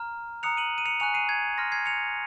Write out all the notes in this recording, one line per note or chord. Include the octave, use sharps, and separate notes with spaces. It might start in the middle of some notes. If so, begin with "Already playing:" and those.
Already playing: A#5 F6
A#5 D#6 F#6 C#7 F7
D#7 F#7
D#7
C#7 F7
G#5 C#6 F#6 C#7 F7
C7 D#7
G#6
C6 F6 A#6
G#6 C7
C#7 F7